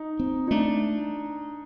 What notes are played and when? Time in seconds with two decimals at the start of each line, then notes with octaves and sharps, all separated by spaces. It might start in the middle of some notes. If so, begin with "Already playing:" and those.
Already playing: D#4
0.19 C4
0.48 D#4
0.51 A3 D4